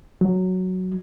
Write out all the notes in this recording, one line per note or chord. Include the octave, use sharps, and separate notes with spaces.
F#3